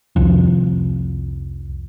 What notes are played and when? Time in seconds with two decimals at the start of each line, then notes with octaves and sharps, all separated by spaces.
0.16 C2 F2